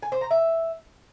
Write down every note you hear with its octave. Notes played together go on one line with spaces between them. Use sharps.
G#5
C5
A#5
E5